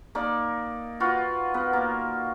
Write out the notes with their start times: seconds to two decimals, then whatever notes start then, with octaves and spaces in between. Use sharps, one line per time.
0.15 A#3 D#4 D5
1.00 F4 F#4 B4
1.54 B3 A#4
1.73 A#3